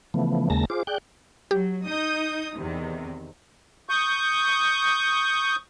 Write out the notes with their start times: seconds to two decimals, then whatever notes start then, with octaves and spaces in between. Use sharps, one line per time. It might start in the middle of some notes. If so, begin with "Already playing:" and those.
0.14 C#3 E3 F3 A3 B3
0.50 D#2 C#3 G#3 A#3 A5 A#6
0.70 F4 G#4 C5 D6
0.87 G#4 D5 G5 F#6 G6
1.51 F#3 G4
1.84 D#4 D#6 G6
2.56 E2 C3 D#3
3.89 C#6 D#6 G6